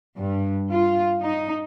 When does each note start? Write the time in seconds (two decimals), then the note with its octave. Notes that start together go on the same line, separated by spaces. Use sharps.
0.18 G2
0.72 F4
1.23 D#4